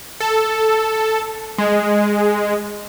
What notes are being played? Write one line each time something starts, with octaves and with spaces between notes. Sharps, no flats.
A4
G#3